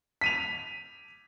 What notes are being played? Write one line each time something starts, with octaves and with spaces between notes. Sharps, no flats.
B6 D#7 F7